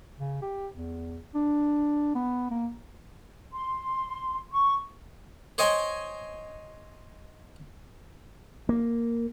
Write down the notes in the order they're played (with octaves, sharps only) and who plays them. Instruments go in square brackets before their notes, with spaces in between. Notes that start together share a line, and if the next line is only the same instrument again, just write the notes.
[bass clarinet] C#3
G4
E2
D4
B3
A#3
[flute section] C6
C#6
[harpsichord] C5 C#5 D#5 G5 G#5 C6
[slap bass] A#3